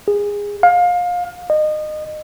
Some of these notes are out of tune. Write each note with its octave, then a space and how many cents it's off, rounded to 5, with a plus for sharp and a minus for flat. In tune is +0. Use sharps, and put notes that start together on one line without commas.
G#4 -20
F5 +25
D#5 -25